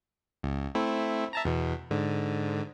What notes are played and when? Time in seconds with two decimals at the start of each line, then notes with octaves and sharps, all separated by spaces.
0.43 C#2
0.75 A3 C4 E4
1.33 E5 A5 A#5
1.45 E2 B2
1.91 G#2 D3